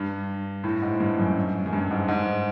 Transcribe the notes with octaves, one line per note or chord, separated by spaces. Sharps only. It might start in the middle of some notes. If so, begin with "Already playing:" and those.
Already playing: G2
A2
G#2
G2
F#2
F#2
G2
G#2
G#2